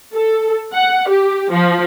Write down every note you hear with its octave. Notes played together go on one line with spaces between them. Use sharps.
A4
F#5
G4
F3